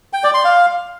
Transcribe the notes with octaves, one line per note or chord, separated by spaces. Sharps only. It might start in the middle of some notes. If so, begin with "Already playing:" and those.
G5
D5
C6
F5